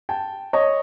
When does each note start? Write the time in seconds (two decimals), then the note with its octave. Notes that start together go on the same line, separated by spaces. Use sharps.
0.09 G5 A5
0.53 C#5 D#5